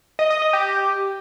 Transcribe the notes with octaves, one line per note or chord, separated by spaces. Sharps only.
D#5
D#5
D#5
G4